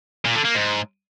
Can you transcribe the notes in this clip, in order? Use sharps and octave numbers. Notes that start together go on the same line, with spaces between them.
A#2
D3
A#3
G#2